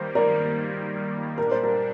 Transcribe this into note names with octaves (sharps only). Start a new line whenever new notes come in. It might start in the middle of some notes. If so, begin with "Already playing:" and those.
Already playing: D#3 G3 A#3 C5
A#4 D5
A#2 G3 D4 A#4
C5
A#4